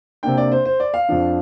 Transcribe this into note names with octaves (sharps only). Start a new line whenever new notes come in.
C3 A#3 D4 G5
D5
C5
C5
D5
F5
F2 F3 D4